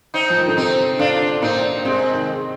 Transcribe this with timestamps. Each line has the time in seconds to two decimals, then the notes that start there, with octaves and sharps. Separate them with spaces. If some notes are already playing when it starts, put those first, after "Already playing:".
0.14 C4 D#4
0.30 F3
0.38 D#3
0.47 D3
0.57 C3 C4 D#4
0.99 D3 D4 F4
1.42 A#2 C4 D#4
1.85 C3 G#3 C4
2.13 D#3